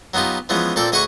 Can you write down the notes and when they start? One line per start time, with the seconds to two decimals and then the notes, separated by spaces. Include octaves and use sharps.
0.14 F#3 B3 D#4 F4 G4
0.49 E3 F3 G#3 B3 C#4
0.76 A#2 C4 A4 D5 G5
0.92 D2 G#4 D#5 F#5 B5 C#6